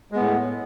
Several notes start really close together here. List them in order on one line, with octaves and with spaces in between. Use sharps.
G#3 B3 A2